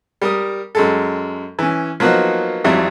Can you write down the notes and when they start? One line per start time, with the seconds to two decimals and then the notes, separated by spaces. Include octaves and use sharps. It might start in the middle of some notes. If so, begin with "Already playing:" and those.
0.22 G3 A#4 D#6
0.75 F#2 G#3 A4
1.59 E3 C#4
2.00 F3 F#3 A#3 B3 D#4 F#4
2.64 G#1 F2 F#3 G3 E4